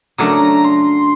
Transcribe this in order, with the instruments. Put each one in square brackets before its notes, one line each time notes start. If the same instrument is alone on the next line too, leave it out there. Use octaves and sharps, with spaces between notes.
[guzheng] C#3 F#3 A3 D4 [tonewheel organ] A#5
[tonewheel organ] C6